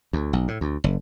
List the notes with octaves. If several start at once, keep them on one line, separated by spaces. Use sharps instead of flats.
D2
B1
A2
D2
F#1